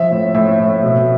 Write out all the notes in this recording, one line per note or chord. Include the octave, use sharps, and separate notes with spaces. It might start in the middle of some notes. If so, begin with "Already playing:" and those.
Already playing: F3 E5
A2
A2 E5
A2
B2